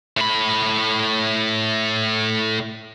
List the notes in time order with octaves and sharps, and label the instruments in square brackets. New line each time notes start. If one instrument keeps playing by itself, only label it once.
[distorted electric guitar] A2 B5